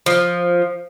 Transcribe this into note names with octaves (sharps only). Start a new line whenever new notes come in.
F3